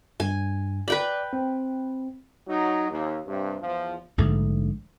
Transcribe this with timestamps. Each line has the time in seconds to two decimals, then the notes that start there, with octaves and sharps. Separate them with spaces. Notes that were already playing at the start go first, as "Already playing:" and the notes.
0.20 G2 G#5
0.88 B4 D5 G5 B5
1.33 C4
2.47 F#3 D#4
2.90 D#2
3.27 G2 C3
3.61 E2 F3
4.18 A#1 G#2 D3 A3